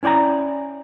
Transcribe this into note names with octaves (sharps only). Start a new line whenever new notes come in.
C#4 E4 D5 G5 A#5